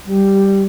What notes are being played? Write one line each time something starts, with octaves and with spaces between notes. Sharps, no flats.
G3